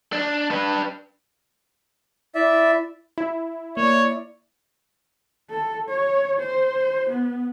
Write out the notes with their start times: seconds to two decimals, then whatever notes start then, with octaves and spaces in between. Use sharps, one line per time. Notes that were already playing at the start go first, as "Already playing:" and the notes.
0.13 D4
0.51 D4 B4
2.35 E4 D5 E5
3.18 E4
3.77 A#3 C#5 D5
5.51 A4
5.89 C#5
6.40 C5
7.10 B3